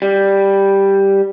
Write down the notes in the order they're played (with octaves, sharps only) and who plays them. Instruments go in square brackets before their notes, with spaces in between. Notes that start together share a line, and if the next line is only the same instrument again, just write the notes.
[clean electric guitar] G3